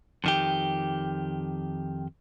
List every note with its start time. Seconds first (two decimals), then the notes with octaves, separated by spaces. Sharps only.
0.24 F2 D#3 G4